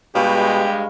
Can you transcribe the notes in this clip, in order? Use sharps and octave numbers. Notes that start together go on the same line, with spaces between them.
G2 B2 G#3 G4 F5 B5 C#6